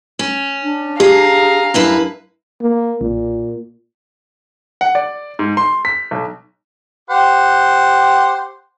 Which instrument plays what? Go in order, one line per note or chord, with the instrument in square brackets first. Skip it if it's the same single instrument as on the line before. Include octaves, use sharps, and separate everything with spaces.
[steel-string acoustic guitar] C#4
[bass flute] D4
[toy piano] G4 [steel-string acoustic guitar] G#4 [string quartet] F5 A#5
[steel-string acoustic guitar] F#2 E4 B4 [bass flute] D4
[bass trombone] A#3
[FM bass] B1 [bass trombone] A#2
[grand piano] F#5
D5
G#2
C6
B6
B1
[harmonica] G4 C5 F#5